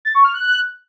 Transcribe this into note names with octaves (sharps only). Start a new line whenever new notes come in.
A6
C#6
F6
F#6